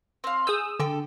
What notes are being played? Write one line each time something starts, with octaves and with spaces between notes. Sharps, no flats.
C4 F5
G#4 D#6 E6 G6
D3 A4 G5